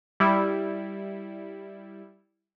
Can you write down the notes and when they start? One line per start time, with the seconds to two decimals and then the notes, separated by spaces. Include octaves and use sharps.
0.20 G3 E4